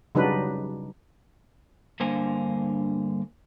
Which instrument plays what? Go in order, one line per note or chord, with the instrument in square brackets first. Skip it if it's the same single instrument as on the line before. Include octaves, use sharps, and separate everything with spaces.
[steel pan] C#3 F#3 G3 D4 D#4 B4
[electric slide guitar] G2 D3 A#3 C5 F5 G#5